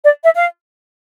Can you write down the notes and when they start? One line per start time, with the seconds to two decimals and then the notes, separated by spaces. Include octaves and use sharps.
0.04 D5
0.24 E5
0.35 F5